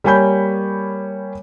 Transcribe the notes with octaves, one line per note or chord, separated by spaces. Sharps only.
G3 A#3 C#5 G#5 B5 G6